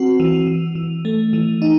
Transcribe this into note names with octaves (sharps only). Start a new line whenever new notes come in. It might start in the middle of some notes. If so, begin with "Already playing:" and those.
Already playing: C4 F#4
E3
E3
E3
A3
E3
D#4